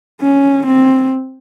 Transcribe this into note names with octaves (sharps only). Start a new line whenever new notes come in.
C#4
C4